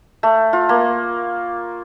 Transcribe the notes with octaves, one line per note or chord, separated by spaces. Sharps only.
A3
F4
A#3